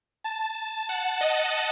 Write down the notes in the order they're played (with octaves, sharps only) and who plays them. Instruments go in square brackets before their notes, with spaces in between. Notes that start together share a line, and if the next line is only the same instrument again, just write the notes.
[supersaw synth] A5
F#5
D#5